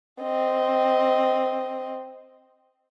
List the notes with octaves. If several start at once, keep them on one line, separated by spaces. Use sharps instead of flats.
C4 D#5